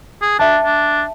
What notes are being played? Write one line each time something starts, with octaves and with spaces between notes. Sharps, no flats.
G#4
D4 E5 A5
D4